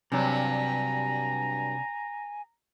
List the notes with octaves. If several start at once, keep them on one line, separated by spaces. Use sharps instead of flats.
G2 C3 F#3 D4 G#5 A#5